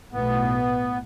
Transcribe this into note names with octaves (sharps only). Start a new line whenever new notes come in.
B1 A2 B3